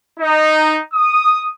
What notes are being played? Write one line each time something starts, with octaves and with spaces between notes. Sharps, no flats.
D#4
D#6